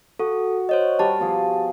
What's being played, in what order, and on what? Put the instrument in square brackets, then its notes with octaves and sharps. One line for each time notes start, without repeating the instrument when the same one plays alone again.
[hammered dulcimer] F#4 [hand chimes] A4
[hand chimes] C5 C#5 D#5
[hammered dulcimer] G3 A#4 [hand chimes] G4 A5
[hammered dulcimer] B2 F3 G#4